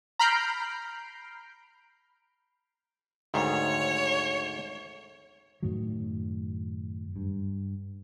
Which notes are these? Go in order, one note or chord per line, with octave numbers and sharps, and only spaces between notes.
A#5 B5 F6 G6 C7 D7
D2 G#2 D#3 C#5
F#2 A2 D#3 F#3
G2